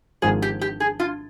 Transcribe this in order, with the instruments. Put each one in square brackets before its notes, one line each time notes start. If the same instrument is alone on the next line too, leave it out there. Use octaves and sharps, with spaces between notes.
[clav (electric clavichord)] G#1 G#2 F3 [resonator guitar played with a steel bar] G#4
[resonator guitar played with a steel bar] G4
G4
G#4
F4